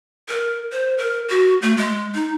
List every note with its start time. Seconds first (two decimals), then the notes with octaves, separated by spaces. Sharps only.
0.28 A#4
0.72 C5
0.98 A#4
1.29 F#4
1.62 A3
1.77 G#3
2.15 D#4